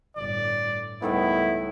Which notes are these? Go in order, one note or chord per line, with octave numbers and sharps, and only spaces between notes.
G1 A2 D5
C#2 A2 D#3 G3 B3 E4 E5